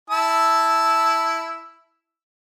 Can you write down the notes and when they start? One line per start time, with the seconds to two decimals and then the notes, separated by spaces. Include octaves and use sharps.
0.10 E4 A5 E6